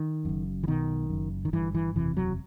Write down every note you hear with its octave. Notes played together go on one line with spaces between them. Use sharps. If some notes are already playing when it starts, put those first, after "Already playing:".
Already playing: D#3
F#1 F#2
E3
B1 B2 D#3
F#1 F#2
D#3
G1 G2 E3
E3
F#1 E2 C3 E3
F#3